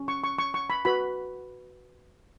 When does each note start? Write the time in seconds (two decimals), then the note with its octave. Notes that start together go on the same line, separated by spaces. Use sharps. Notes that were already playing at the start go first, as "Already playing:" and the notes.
Already playing: C#4
0.08 C#6
0.24 C#6
0.39 C#6
0.54 C#6
0.70 B5
0.85 F#4 B4 B5